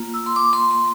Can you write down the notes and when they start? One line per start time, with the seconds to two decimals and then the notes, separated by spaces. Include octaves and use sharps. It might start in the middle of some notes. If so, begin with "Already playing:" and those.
Already playing: A#3 F4
0.14 E6
0.26 C6
0.36 D6
0.53 C6
0.71 C6